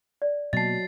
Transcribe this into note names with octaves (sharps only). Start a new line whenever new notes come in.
D5
B2 F#3 A#3 D#5 A5 A6 C7